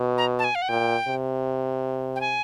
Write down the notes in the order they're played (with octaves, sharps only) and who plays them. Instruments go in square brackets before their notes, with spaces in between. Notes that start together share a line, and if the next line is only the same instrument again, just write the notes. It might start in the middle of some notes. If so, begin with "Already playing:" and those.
Already playing: [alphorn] B2
[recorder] A#5
A5
G#5
F5
F#5
[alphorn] A#2 [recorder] G5
[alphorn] C3
[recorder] G5
G#5